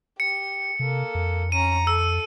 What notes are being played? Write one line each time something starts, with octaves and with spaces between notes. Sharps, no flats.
G4 C#7
C3 A#3 A4
F2
C#4 A#5 D#7
A4 E6